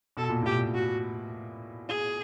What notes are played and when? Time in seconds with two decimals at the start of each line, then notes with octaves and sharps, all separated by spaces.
0.17 B2 A4
0.29 A#2
0.42 A2 G4
0.55 A#2
0.75 F#4
1.89 G#4